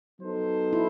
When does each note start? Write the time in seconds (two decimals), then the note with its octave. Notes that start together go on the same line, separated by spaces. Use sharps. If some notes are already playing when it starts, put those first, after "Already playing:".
0.19 F#3 B3 D#4 A4 C5
0.73 E4